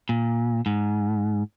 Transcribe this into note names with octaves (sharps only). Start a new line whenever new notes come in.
A#2
G#2